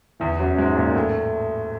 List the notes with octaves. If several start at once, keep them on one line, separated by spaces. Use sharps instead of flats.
E2 E3
F#2 F#3
G#2 G#3
A#2 A#3
A2 A3